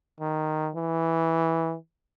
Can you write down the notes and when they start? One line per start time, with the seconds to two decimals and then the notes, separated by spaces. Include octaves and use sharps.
0.20 D#3
0.75 E3